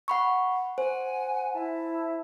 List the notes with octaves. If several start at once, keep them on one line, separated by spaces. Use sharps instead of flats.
F#5 B5 C#6
C5 F#5 G#5
E4 E5 A5